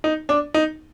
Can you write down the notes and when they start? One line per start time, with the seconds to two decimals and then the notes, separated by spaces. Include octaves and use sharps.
0.04 D#4
0.29 D4
0.54 D#4